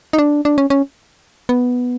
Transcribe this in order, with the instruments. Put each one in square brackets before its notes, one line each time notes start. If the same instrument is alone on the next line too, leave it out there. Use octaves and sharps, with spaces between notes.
[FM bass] D#4
D4
D4
C#4
C#4
B3